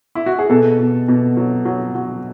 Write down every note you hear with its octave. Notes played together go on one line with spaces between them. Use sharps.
E4
F#4
G#4
B2 A4
B2
B2
F#3
F#3
F#3